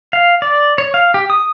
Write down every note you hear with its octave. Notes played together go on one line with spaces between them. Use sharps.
F5
D5
C#5
F5
G4
D#6